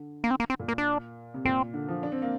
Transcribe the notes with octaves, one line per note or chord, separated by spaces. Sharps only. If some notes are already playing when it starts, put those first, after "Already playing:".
Already playing: D3
A#3
C4
A#3
C4
A#2
A#3
D4
C3
A#2 C4
D3
F3
D4
C4
A#3